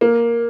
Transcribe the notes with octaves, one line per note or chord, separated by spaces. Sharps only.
A#3